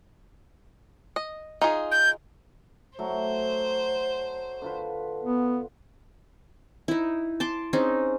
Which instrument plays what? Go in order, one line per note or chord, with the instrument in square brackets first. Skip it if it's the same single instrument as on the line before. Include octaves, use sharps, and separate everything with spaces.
[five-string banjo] D#5
D#4 F4 G#4
[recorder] G6
[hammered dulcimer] F#3 A3 [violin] C5
[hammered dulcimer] D3 F4 B4
[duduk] B3
[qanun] D#4 E4
A5 C6 D6
C4 C#4 D#4 G#4